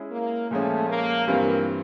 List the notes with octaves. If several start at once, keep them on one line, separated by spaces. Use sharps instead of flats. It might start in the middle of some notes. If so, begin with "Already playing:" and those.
Already playing: G#3 C#4 E4 G#4
A#3
A#2 F3 G#3 A3 C#4
A#3
G2 E3 G3 A#3 C4 F4